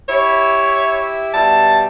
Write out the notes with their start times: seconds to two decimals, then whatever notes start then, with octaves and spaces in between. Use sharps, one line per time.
0.08 E4 G4 C#5 E5
1.34 B2 G3 E5 A5